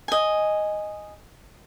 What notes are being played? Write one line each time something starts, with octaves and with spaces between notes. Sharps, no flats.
D#5 G#5